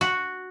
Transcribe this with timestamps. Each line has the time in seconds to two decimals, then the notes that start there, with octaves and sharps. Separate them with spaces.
0.01 F#4